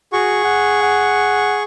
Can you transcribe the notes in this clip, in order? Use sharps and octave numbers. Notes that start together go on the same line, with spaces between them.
F#4 G#4 C#6
F#5
F#5